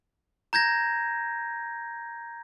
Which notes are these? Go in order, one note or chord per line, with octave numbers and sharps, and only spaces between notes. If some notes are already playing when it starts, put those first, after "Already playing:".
A#5 G6 G#6 A#6